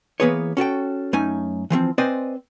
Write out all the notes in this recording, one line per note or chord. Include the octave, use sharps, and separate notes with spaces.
E3 A#3 B3 G#4 B4 C#5
C#4 F#4 A4 G5
F#2 A3 C#4 D#4 G#5
E3 F3 A3 C4
C4 B4 C5 D5 D#5 G#5